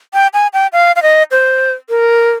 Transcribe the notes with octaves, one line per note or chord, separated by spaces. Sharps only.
G5
G#5
G5
F5
F5
D#5
C5
A#4